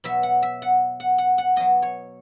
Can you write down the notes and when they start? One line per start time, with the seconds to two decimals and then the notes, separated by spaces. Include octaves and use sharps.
0.04 B2 F#3 E5
0.23 F#5
0.42 E5
0.62 F#5
1.00 F#5
1.18 F#5
1.38 F#5
1.56 B2 F#3 D#5
1.82 C#5